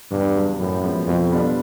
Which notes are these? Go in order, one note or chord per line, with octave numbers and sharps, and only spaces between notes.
E2 G2
C#3 F#3
F#2 A2
F3 G#3 B3
F2 B2
G3 B3 D4 F4